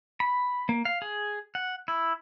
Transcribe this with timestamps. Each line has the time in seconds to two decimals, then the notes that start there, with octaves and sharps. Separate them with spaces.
0.20 B5
0.69 A#3
0.85 F5
1.02 G#4
1.55 F#5
1.88 E4